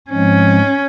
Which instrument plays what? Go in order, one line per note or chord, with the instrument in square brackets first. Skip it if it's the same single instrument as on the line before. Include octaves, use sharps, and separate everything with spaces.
[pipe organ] G#2 F3 G#3 C4 [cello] C#4